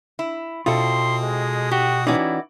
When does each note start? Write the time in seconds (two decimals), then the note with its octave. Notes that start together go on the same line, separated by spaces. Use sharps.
0.19 E4
0.66 B2 C4 E4 F4 A4 C6 D#6
1.23 G#3
1.71 F#4 G4
2.07 E3 C#4 D#4 E4 F#4 D5